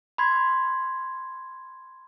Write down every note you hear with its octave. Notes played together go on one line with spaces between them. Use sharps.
B5 C6 G#6